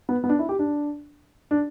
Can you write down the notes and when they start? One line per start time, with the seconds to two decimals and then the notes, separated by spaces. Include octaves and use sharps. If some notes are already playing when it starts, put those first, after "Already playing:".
0.09 B3
0.24 B3
0.29 D4
0.39 E4
0.49 G4
0.59 D4
1.51 D4